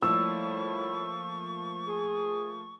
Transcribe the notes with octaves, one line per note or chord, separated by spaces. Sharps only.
A2 F3 G3 A3 A#3 E4 C#6 E6
G#4